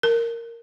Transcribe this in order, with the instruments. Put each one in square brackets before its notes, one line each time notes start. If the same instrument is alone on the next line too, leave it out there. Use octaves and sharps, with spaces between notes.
[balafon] A#4